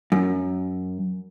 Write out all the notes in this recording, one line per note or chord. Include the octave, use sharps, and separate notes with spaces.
F#2